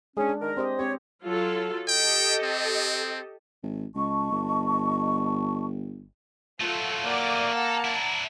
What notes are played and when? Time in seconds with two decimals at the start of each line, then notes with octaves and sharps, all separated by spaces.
0.17 G#3 C#4 D4 G#4
0.29 D4
0.41 D#3 A#4
0.57 C4 G4 C5 D#5
0.79 C4 G4 C#5
1.24 F#3 F4 A4
1.88 G4 A4 D#5 G5
2.43 C4
3.63 G#1
3.95 C#2 D#5 A5 C#6
4.32 G1
6.61 F#3 A3 F4 A4 F#5
7.06 A#3 D5 F#5 D6
7.52 A4 F#5 A5 A#5
7.85 D4 E4